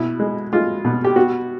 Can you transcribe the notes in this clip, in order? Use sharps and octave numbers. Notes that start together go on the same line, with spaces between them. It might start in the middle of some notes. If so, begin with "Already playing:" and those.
Already playing: B2 E4
G#3
G#3 F4
B2
G4
B3 F#4